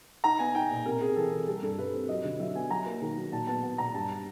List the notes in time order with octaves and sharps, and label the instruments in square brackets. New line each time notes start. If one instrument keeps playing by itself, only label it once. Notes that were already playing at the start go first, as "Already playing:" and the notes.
[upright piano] D#4 [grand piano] A#5
[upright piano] B3 [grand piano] G#5
[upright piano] D#4 [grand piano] G5
[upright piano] A#2
[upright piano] C3 [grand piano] A#4
[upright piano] C3 [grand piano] G#4
[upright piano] E3 [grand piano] A4
[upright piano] C3
[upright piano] G3 [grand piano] A4
[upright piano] G2 [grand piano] A4
[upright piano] G2 [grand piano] B4
[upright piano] C4
[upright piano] F#3 [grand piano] D#5
[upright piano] D3
[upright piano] F#3 [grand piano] E5
[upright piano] B3 [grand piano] G#5
[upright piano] F#3 [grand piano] A#5
[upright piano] A#3
D#3
F#3
[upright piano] A#2 [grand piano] A5
[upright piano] B3 [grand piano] A5
[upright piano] B3 [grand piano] A5
[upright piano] A#2 [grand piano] A#5
[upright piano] G2 [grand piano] A5